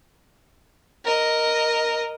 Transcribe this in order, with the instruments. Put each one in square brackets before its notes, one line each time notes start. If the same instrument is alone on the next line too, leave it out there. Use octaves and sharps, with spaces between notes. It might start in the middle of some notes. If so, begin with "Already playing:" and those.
[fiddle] A#4 D#5